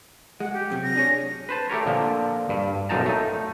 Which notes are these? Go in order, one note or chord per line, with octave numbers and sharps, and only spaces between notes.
G#3 F#5
G4
F#2 C3 F#3
A#6
D4 G#4 C#5
B4 C5 A5
A3 G4 A#4 C#5
A#2 D3 F3
G2
B1 F#2 A#2 D#4 A5 A#5
A3 D#4